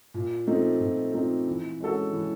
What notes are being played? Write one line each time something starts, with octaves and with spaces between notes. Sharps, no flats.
A#2
F3 A3 C4 D#4
A#2
F3 A3 C4 D#4
E3
G#3 C#4 F#4 A4
E3